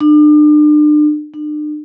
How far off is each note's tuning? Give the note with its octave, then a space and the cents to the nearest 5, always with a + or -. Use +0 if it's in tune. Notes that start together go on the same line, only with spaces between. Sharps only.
D4 +40
D4 +45